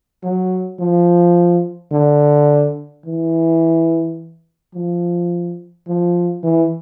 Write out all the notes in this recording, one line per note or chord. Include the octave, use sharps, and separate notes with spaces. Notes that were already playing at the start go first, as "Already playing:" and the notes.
F#3
F3
D3
E3
F3
F3
E3